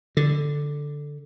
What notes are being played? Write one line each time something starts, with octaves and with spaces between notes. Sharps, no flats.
D3